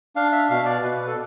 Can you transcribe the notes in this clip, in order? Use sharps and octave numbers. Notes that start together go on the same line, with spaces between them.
D4 F5
E5
B2 F5
D5
B2 B4
A4